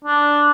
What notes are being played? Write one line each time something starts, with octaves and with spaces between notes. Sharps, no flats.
D4